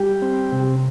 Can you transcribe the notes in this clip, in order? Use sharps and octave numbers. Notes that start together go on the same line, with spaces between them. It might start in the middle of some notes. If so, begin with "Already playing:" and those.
Already playing: G3 G4
C4
C3